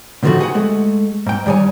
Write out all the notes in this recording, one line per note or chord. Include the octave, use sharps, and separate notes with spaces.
A2 D3 D#3 F3 A3 F#4
G4 G#4 B4 F#5
G#3 A3
G#2 G5
G2 D#3 G3 C#5 G#5